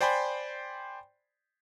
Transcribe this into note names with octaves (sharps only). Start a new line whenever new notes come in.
C5 D5 G5 G#5 B5 C6